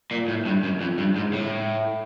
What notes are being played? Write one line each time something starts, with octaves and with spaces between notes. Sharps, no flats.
A#2
A2
G2
F#2
F2
G2
G#2
A2